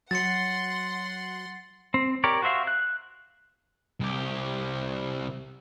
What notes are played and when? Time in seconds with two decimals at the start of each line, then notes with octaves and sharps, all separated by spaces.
0.11 F#3 F#5 C6 A6 C#7
1.94 C4
2.24 G4 A#4 C#5 D5
2.42 F#4 C5 E5 F5
2.67 F#6
4.00 C2 G4